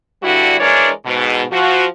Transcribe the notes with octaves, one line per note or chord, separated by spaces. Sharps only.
G2 D3 G3 E4 F#4
E3 G#3 D4 A#4 C#5 D5
G#2 B2
F3 F#4